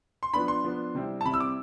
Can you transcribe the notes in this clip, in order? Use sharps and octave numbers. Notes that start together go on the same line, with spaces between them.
C6
F3 B3 D4 B5
C6
F3 B3 D4
C3 G3 C4 E4
A5
C3 G3 C4 E4 B5
E6
D6